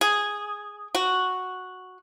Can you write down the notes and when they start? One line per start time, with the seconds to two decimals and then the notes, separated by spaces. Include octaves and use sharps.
0.01 G#4
0.95 F#4